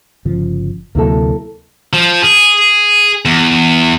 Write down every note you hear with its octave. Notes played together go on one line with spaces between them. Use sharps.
G1 C#3 F3
D2 C3 F#3 A#3 E4 A4
F3
G#4
E2